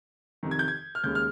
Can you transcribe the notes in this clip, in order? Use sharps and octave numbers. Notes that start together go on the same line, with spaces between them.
F2 C3 D#3
G#6
G6
G#6
F6
D#2 C#3 G#3 G6
F6